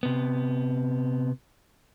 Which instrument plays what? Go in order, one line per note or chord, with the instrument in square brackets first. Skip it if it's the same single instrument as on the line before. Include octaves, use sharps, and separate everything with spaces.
[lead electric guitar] C3 B3